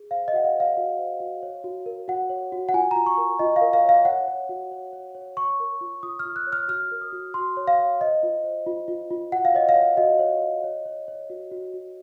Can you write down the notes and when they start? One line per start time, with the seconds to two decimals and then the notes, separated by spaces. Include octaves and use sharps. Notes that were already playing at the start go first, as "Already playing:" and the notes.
Already playing: G#4
0.11 C5 F5
0.28 D#5
0.33 F#4 F#5
0.44 F5
0.55 C5 F5
0.77 F#4
0.99 C5
1.20 F#4
1.43 C#5
1.64 F#4
1.86 A#4
2.08 F#4 F#5
2.30 C#5
2.52 F#4
2.69 F#5
2.74 F4 G#5
2.91 F4 A#5
3.06 C#6
3.18 A#4
3.39 F4 D#5
3.56 F5
3.61 A#4
3.73 F5
3.84 C#5 F5
4.05 C#5 F#5
4.28 C#5
4.49 F#4
4.72 C#5
4.93 C#5
5.15 C#5
5.37 C#5 C#6
5.60 A#4
5.81 F4
6.03 F4 D#6
6.19 F6
6.25 F4
6.36 F#6
6.47 C#5
6.53 F6
6.68 F#4 F6
6.91 A#4
7.01 D#6
7.13 F#4
7.34 F#4 C6
7.57 C#5
7.68 F5
7.79 C#5
8.01 C5 D#5
8.23 F4
8.44 C5
8.66 F4
8.88 F4
9.11 F4
9.32 F#4 F#5
9.45 F5
9.55 C#5 D#5
9.69 F5
9.75 C#5
9.97 F#4 D#5
10.19 C#5
10.41 C#5
10.64 C#5
10.86 C#5
11.08 C#5
11.30 F#4
11.51 F#4
11.74 F#4